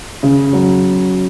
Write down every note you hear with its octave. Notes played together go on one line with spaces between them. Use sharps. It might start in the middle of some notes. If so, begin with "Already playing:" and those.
C#3
F#3